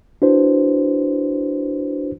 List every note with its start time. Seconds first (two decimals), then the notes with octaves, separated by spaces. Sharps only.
0.22 D4 E4 F#4 B4 C5